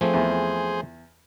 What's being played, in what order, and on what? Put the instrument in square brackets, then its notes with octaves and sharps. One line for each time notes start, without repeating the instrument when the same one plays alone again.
[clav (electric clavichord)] F3 A3 C4 [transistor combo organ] G#4 C5
[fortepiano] E2